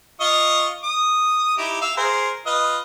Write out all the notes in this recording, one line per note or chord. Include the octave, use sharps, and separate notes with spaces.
F4 D#5 C#6
D#6
D#4 E4 G4
E5 F5
G#4 A#4 C5
F4 B4 D#5